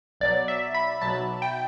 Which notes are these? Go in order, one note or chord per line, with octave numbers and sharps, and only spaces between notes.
B1 B2 F#3 D5
E5
B5
B1 B2 F#3 A5
G5